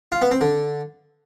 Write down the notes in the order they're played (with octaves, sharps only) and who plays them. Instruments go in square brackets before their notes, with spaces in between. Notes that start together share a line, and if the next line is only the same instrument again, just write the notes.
[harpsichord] F4
B3
C4
D3